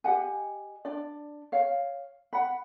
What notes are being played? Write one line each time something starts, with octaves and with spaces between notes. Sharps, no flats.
G4 D#5 F#5 G#5
D4 D5
C#5 F5
F#5 B5